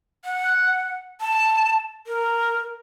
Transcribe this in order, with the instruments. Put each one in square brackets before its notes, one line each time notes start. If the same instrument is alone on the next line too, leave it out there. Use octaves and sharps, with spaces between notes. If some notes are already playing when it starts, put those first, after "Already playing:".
[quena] F#5
A5
A#4